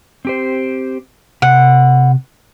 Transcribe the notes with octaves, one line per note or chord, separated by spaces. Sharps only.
C4 G4 C5
C3 F#5